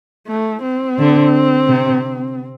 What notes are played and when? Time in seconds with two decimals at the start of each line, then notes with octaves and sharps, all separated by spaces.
0.28 A3
0.62 C4
0.98 D3
1.68 C3